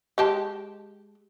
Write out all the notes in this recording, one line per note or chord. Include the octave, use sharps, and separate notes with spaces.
G#3 G4 A5